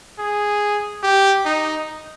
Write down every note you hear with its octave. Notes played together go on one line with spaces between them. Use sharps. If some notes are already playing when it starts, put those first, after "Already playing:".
G#4
G4
D#4